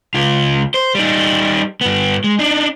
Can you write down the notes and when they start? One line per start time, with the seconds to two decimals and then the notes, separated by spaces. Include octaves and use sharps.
0.14 C#2 F4
0.74 C5
0.95 G3 D#4
1.81 G2 B3
2.24 G#3
2.39 D4 D#4